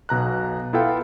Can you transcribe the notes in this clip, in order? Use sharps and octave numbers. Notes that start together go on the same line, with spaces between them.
B1 B2 A#5 F#6
B3 E4 F4 A4 F5 G5